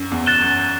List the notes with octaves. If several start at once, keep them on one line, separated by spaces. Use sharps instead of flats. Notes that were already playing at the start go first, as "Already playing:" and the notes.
Already playing: F#2
E2
F#6 A6 E7 G7
F#2